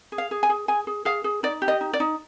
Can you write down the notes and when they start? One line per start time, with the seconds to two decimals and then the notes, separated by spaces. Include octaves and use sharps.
0.12 G#4
0.18 F5
0.31 G#4
0.43 G#5
0.49 G#4
0.68 G#4 G#5
0.87 G#4
1.05 G#4 F5
1.24 G#4
1.43 D#4 D5
1.62 G4
1.68 D#5
1.81 D#4
1.93 D5
2.00 D#4